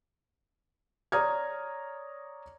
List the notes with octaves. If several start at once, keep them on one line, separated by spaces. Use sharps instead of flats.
C#5 D5 A#5 D#6 F6 G#6